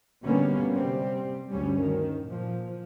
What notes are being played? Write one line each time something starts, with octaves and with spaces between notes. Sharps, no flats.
B2 D3 G3 A#3 B3 C#4
C3 G3 C4
D2 G2 G3 C#4
D#3
A#2 F3